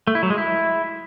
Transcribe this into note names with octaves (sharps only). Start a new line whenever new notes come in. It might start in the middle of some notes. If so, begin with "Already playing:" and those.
A3
E4
F#3
G#3
E4